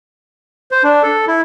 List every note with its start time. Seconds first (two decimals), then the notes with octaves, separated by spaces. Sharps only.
0.71 C5
0.84 D4
1.03 A4
1.27 E4